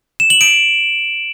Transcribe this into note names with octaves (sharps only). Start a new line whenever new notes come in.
E7
F#7
D7